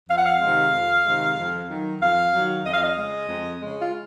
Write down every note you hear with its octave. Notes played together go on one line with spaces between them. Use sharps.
F2 F5
F#5
F5
C3 D#3 G#3
F2
C3 D#3 G#3
F2
D#3 F#3
F2 F5
D#3 F#3
F2 D#5
F5
D#5
C#3 G#3
F2
C#3 G#3
F4